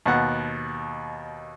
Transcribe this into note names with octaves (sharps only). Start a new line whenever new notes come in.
D#2 B2 F#5